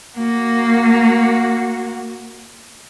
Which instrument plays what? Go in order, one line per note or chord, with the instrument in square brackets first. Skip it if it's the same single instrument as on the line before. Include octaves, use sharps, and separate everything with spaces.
[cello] A#3 F#4